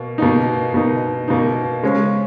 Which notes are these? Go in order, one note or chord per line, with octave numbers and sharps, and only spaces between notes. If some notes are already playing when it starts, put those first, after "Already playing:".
Already playing: B2 A#3
B2 A#3 D#4
B2 A#3 D#4
B2 A#3 D#4
C#3 G#3 C#4